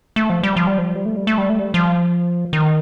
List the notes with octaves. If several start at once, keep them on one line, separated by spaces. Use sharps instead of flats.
A3
F3
G3
F3
G3
F3
G3
A3
G3
A3
G3
A3
G3
F3
D#3